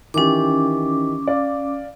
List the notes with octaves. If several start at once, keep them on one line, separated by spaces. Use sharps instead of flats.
D#3 E3 C#4 G4 D6
D5 F5